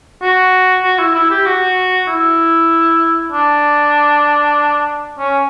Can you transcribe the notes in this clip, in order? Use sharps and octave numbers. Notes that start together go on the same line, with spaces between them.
F#4
F#4
E4
E4
G4
F#4
E4
D4
C#4